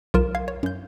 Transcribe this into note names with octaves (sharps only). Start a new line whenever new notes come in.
B1 F4 A#4 E7
F5 G#6 C7
C#5
F#2 G6